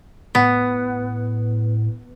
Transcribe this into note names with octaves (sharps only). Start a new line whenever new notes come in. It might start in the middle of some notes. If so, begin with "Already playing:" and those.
A2 B3